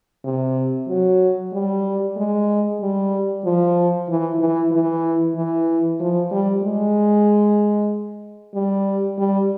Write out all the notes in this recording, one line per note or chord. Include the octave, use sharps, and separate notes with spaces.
C3
F#3
G3
G#3
G3
F3
E3
E3
E3
E3
F3
G3
G#3
G3
G3